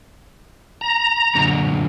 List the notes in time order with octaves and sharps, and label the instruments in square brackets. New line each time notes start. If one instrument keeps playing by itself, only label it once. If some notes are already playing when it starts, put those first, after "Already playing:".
[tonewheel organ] A#5
[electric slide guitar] F#2 A#2 D3